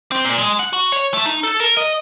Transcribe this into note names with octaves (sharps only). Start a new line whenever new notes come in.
C4
A#2
G#3
F#5
F#4
C#5
A3
D#4
A4
A#4
D#5